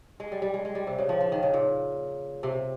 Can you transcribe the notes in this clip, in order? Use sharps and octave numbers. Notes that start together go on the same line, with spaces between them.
G#3
G3
G3
G#3
G#3
G3
C3
C#3
F3
F3
D#3
C#3
A#2
C3